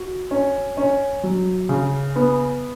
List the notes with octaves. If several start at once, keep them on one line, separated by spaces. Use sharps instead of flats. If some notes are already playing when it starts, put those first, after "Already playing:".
Already playing: F#4
C#4
C#4
F#3
C#3
B3